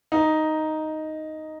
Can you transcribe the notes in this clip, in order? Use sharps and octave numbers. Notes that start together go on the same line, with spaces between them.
D#4